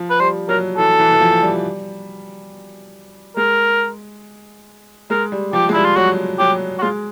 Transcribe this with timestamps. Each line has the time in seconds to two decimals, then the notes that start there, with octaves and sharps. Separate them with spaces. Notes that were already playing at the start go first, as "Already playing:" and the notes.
Already playing: F3
0.10 B4
0.20 G3 C5
0.49 F#3 A#4
0.77 E3 A4
0.99 E3
1.12 E3
1.21 F3
1.42 G3
3.37 G#3 A#4
5.10 G#3 A#4
5.32 G3
5.53 F3 G4
5.69 G#3
5.73 G3 E4
5.85 F4
5.96 F#3 F#4
6.39 F#3 G4
6.79 F#4
6.82 G#3 F4